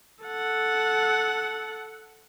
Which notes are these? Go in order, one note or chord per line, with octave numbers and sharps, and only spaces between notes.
A4 F#5